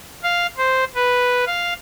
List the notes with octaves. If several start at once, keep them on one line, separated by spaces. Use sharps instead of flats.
F5
C5
B4
F5